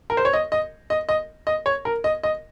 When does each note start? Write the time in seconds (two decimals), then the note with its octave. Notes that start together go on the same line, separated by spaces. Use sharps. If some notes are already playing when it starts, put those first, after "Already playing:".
0.10 A#4
0.17 C5
0.25 C#5
0.33 D#5
0.52 D#5
0.90 D#5
1.09 D#5
1.47 D#5
1.66 C#5
1.85 A#4
2.04 D#5
2.23 D#5